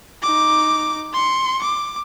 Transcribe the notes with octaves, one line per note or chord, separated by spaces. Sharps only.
D#4 D6
C6 C#7
D6